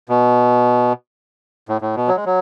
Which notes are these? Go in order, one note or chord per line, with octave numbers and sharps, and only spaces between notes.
B2
A2
A2
B2
F#3
G#3
F#3